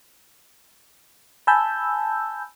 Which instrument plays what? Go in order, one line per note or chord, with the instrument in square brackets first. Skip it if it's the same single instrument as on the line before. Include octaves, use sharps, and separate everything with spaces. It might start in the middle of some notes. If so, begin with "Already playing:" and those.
[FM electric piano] G#5 A5 B5 E6 G6